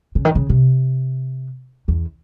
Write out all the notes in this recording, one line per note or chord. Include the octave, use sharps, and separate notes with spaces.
C#3
D#3
C#3
C3
E2